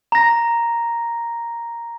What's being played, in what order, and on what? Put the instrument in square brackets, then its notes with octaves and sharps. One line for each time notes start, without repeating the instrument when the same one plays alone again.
[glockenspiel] A#5 A#6